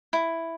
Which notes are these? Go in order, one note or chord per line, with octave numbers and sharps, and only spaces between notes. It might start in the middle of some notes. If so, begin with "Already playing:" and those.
E4